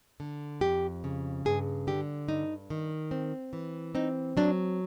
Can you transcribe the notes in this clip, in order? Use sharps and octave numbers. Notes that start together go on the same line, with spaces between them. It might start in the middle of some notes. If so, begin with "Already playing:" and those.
D3
F2 G4
C#3
G2 G#4
D3 G4
G2 D#4
D#3
C4
E3
C4 D#4
F#3 D4